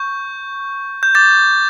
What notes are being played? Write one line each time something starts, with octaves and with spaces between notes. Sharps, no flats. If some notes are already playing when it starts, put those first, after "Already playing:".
Already playing: C#6 G6
G6
D6 G6 A6